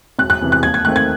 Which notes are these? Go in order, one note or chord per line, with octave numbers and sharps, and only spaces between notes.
E1 F#6
F#6
E2 C3 E3
F#6
D#2 G#6
G#6
D#3 A3 C4 F#6
G#6